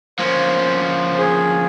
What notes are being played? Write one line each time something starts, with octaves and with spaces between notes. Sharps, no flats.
F3 A#3 C#4 C5
G#4